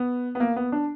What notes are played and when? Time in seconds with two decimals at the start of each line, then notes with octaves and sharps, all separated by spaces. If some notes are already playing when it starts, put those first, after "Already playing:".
Already playing: B3
0.35 B3
0.40 A#3
0.56 B3
0.72 D4